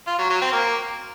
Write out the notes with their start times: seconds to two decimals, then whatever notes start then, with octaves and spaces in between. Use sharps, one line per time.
0.07 F4
0.18 F#3
0.30 F#3
0.41 C4
0.53 A#3